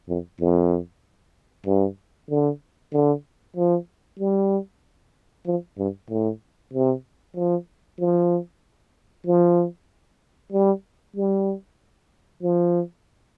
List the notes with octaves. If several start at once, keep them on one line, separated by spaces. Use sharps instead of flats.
F2
F2
G2
D3
D3
F3
G3
F3
G2
A2
C3
F3
F3
F3
G3
G3
F3